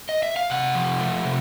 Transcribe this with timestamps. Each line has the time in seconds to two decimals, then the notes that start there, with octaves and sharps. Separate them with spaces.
0.09 D#5
0.23 E5
0.36 F5
0.50 C3 F#5
0.75 F3
0.99 A3
1.25 C3